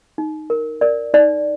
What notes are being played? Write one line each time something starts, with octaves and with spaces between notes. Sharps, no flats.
D#4
A#4
A#4 D5
D#4 D5